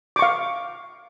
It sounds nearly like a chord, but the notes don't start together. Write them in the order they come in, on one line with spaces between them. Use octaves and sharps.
D6 C#6 F5